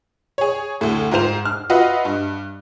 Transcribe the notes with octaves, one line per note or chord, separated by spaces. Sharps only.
G#4 C#5
D2 A2
G#2 F4 C5 F7
F6
F4 F#4 B4 D#5 E5
G2